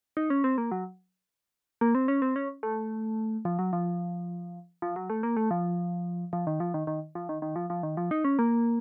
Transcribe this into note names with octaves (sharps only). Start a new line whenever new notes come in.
D#4
C#4
C4
A#3
F#3
A#3
C4
C#4
C4
C#4
A3
F3
F#3
F3
F3
F#3
A3
A#3
A3
F3
F3
D#3
F3
D#3
D#3
F3
D#3
D#3
F3
F3
D#3
F3
D#4
C#4
A#3